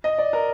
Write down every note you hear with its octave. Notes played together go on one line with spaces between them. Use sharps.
D#5
D5
A#4